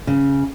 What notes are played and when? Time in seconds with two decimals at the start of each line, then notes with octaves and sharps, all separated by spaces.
0.07 C#3